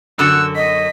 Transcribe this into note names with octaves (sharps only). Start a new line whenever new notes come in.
F#2 D3 F#4 E6 F#6
D#5 B6